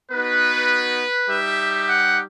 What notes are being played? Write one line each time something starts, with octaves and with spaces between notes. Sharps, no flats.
B3 D#4 F#4 B4
G3 D#4 G4 E5
F#5